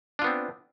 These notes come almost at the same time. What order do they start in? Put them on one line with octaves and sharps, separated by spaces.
D4 F4 B3 C4